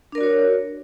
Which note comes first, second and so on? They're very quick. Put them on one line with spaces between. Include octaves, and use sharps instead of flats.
D4 A#4 D5 F#4 C#5